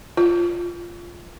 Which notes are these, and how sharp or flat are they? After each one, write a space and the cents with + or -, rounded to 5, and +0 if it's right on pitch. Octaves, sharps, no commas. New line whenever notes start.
F4 -10